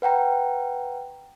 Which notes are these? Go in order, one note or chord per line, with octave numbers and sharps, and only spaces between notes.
B4 F#5 G5 A#5